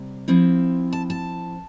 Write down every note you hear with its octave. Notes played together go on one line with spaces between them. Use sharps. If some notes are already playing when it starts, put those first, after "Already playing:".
Already playing: C3 G3
F3 C4 E4
A5
A5